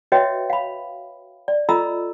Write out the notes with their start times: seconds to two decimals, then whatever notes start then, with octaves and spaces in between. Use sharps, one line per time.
0.12 F#4 B4 C#5 D#5 E5 G5
0.50 F5 B5
1.48 D5
1.69 F4 A4 D#5 A#5 B5 E6